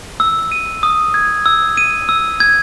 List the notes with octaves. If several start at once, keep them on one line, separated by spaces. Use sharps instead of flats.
E6
D#7
D#6
G#6
E6
D#7
E6
G#6